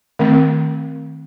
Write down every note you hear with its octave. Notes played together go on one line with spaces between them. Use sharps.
D#3 A3 C4